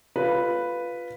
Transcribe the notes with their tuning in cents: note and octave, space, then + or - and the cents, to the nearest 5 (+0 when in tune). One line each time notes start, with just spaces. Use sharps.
F4 +0 B4 +0